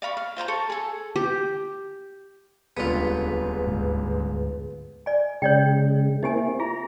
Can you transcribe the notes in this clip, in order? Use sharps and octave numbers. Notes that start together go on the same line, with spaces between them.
D5 F5 B5 C#6
F5
F4 C5 G#5 A#5
A4 C#6
G#4 A4
G4
D#1 C#2 D3 B3 F4 G#4 B4
D2 G#2
D5 G#5
C#3 G#3 C#5 D5 G5
A#3 C4 D#4 E4 G4 G#5
F4 G#4 A#5